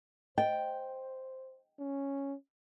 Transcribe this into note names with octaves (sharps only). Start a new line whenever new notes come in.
C5 D#5 G5
C#4